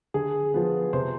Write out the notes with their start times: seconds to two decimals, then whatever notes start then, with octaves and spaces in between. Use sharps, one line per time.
0.14 D3 G#4
0.54 F3 B3
0.93 C3 C5